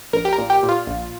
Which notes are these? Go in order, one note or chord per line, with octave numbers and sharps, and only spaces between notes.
A#1 A#4
G4
A#4
A#2
G4
A#2
F4
A#1